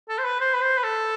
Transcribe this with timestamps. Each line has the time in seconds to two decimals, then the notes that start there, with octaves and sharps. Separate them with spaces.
0.09 A4
0.18 C5
0.24 B4
0.41 C5
0.54 B4
0.62 C5
0.78 B4
0.84 A4